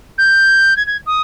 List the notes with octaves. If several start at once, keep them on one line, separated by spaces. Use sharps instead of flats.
G6
G#6
G#6
D#6